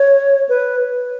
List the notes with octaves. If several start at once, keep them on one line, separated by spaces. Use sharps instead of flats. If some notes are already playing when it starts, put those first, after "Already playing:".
Already playing: C#5
B4